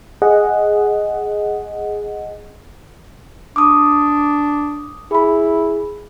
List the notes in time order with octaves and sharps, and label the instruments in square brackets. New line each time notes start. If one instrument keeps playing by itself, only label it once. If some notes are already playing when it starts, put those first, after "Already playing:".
[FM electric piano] G#4 D#5 F#5
[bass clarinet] D4 [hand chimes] D6 D#6
[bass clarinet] E4 [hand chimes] G#4 B5